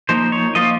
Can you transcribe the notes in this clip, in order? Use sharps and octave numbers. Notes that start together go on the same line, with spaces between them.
F3 A#3 D#4 C5
C#5
F3 A#3 F4 D#5